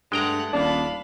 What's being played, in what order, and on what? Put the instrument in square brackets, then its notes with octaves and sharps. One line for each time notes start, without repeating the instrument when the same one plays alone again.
[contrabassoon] G2 [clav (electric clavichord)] G#3 G5 A#5 [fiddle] A3 F#5
[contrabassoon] D#1 [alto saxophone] D4 [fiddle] F5 B5